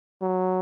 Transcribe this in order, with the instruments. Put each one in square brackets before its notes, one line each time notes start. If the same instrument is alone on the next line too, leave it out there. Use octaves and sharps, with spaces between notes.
[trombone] F#3